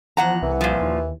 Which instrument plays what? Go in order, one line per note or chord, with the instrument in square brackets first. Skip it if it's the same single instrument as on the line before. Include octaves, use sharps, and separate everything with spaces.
[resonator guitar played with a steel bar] E2 F#5 A#5 [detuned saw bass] F3
[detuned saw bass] C2 [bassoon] E3
[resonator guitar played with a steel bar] A#2 F3
[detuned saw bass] D#2